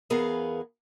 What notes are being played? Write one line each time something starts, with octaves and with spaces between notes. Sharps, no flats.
E2 B3 G#4 A#4 F5